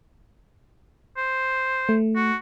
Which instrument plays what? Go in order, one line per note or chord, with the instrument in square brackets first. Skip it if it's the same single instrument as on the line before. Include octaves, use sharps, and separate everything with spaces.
[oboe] C5
[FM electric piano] A3
[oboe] F#4